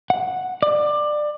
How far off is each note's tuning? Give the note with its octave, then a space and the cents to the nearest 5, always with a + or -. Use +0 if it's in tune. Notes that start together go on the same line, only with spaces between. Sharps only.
F#5 -5
D5 +20